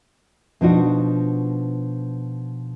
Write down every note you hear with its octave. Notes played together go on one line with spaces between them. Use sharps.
B2 F3 D4 D#4 F#4